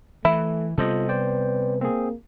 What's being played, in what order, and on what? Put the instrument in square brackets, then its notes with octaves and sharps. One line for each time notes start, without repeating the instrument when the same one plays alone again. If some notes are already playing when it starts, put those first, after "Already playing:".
[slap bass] E3 [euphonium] A3 [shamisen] E4
[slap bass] C3 G3 B3 [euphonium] F4 [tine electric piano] A4 C5 D#5
[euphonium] B4 [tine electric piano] C5 D5 G5
[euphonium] A#3 [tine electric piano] C4 G#4